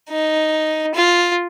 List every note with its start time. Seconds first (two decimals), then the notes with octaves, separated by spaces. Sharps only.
0.10 D#4
0.95 F4